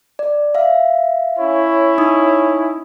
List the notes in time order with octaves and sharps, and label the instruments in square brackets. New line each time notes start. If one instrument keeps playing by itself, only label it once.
[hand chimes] D5
E5 F5
[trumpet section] C#4 E4 C#5
[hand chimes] D#4 D#6